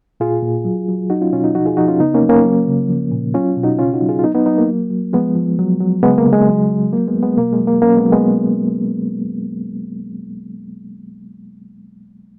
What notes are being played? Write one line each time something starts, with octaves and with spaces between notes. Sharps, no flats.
A#2 F4 G#4
A#2
F#3
F#3
F#3 D#4 F#4
C#4 F4
B2 C#4 F4
D#4 F#4
F3 D#4 F#4
F4 G#4
F3 D#4 F#4
C#4 F4
C#3 B3 D#4
A#3 C#4
F#3
A#3 C#4
F#3
C#3
F3
A#2
F#3 C#4 F4
B2
D#4 F#4
C#3 C#4 F4
D#4 F#4
F#3
F4 G#4
F4
F#3 B3 D#4
B3 D#4
F#3 B3 D#4
A#3
F#3
F#3
F3 G#3 B3
F3
F#3
F#3
C#3 G#3 B3
A#3
C#3
G#3
F#3
F#3
F#3 A#3
G#3 B3
F#3
G#3 B3
B2 A#3
G#3
F#3
A#3
F#3 A#3 C#4
G#3 B3
F#3
G#3 B3